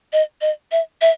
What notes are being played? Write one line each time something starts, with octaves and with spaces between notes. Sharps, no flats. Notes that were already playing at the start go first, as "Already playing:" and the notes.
D#5
D#5
E5
E5